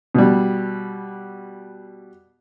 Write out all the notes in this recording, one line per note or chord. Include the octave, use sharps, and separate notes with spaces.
B2 G3